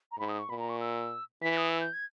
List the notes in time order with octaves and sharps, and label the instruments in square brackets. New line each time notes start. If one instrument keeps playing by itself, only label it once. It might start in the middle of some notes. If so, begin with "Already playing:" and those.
[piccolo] A#5
[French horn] G#2 [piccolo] B5
[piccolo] D#6
C#6
[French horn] A#2 [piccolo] B5
[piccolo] A#5
C#6
E6
[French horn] E3 [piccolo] B6
[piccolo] D#6
E6
G6
G#6